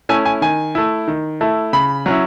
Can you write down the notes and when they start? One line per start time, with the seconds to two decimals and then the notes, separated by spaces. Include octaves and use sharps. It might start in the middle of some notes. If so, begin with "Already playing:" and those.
0.09 A3 C#4 E4 G#5
0.26 G#5
0.42 D#3 G#5
0.75 A3 E4
1.08 D#3
1.41 A3 E4
1.73 C#3 B5
2.06 F#3 C#4 E4